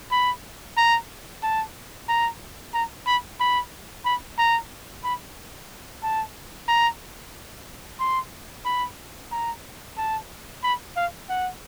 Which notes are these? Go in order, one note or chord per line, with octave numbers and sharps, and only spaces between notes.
B5
A#5
A5
A#5
A#5
B5
B5
B5
A#5
B5
A5
A#5
C6
B5
A#5
A5
B5
F5
F#5